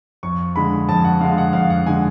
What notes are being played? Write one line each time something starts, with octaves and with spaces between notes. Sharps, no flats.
F2 C#6
D3 G#3 B5
F2 A5
F#5
D3 G#3 F5
F#5
F2 F5
F#5
D3 G#3 G#5